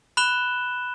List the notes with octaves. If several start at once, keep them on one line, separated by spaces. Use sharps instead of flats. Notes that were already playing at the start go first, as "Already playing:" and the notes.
B5 F#6 E7 G7